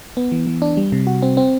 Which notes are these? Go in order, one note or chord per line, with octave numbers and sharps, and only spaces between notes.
B3
E3
E3
D4
G3
C3
F#4
C4
C4